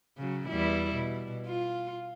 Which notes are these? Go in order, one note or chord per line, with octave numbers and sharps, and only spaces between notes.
C#3 F#3
E2 G3 E4
B2
F4